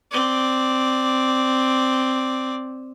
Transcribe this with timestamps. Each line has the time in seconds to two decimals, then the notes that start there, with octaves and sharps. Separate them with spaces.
0.11 C4 D5